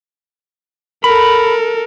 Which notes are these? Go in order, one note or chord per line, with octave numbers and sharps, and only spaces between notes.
A4 A#4 B5